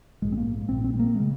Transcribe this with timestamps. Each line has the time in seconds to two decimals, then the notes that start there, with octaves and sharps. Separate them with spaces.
0.22 A#1 G#2 G#3
0.32 C4
0.37 A#3
0.68 A#1 A#2 C4
0.84 C4
0.94 G#3
0.99 A#3
1.15 C#3 G#3